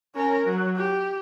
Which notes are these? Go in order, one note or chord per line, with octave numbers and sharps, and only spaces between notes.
C#4 A#4
F#3
G4